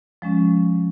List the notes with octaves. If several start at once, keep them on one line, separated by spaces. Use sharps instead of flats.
F3 G#3 C#4